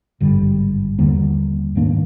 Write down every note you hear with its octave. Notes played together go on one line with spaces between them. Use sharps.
G#1 G2 D3 G3
D#2 D3 G3 A#3
G#2 D#3 A#3 D4